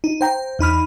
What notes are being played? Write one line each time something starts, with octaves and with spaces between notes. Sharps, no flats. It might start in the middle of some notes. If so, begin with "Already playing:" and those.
D#4
C5 G5 A#5
E2 D#4 B5 F6